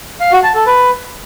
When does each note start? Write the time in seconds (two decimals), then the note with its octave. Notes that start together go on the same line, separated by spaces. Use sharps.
0.21 F5
0.32 F#4
0.44 A5
0.55 A4
0.66 B4